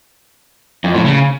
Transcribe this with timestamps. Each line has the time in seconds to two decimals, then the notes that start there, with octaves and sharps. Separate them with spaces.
0.84 F2
0.95 A2
1.05 C#3